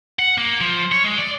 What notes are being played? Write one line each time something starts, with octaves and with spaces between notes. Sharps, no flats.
F#5
A#3
F3
C#5
G#3
D5